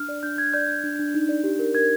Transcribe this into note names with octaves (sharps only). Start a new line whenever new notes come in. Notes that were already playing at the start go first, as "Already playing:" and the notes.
Already playing: D4 F6
D5
D4 G6
D4 G#6
D5 G6
D4
D4
D4
D#4
D5
G4
A#4
A#4 G#6